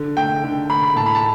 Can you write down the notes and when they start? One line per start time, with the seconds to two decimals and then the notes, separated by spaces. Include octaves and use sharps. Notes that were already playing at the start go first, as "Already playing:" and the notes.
Already playing: D3
0.17 A3 G5
0.44 D3
0.70 A3 B5
0.83 B5
0.96 A2 A5
1.06 B5
1.15 A5